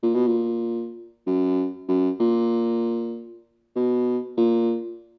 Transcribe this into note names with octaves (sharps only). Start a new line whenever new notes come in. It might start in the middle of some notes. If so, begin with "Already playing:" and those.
A#2
B2
A#2
F#2
F#2
A#2
B2
A#2